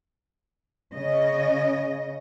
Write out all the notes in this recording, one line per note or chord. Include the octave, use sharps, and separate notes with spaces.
C#3 D#5